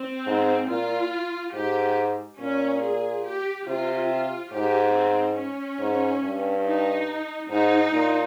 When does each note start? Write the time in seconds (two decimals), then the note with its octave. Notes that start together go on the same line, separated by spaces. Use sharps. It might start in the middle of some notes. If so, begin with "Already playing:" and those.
Already playing: C4
0.27 G#2
0.69 A#2 F4
1.54 G#2 G4
2.39 A#2 C#4
2.82 G#4
3.25 G4
3.67 C3 F4
4.09 F4
4.52 G#2 G4
4.95 C4
5.37 C#4
5.80 G#2
6.22 G2
6.65 D#4
7.50 G#2 D#4
7.93 A#2